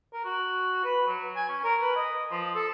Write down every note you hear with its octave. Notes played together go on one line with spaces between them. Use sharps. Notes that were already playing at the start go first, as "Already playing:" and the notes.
A#4
F#4
B4
F#3
G#5
C#4
A#4
B4
D#5
F3
A4